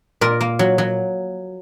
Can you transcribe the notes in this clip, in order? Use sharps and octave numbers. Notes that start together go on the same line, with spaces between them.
A#2 A#4
A#3
F#3
F#3